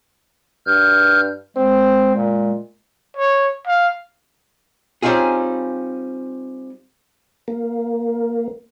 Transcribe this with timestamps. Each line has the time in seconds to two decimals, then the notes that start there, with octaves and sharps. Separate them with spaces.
0.67 G2 F6 G6
1.57 G#3 C4
2.15 A#2
3.17 C#5
3.67 F5
5.02 G3 C4 C#4 D#4 F4 G#4
7.48 A#3